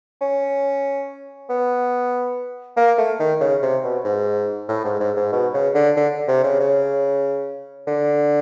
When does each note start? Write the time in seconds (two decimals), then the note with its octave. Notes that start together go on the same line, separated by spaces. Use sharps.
0.21 C#4
1.50 B3
2.77 A#3
2.98 A3
3.19 D#3
3.40 C#3
3.62 C3
3.83 B2
4.05 G#2
4.68 A2
4.85 G#2
5.00 G#2
5.17 G#2
5.32 B2
5.54 C#3
5.75 D3
5.97 D3
6.28 C3
6.44 C#3
6.60 C#3
7.87 D3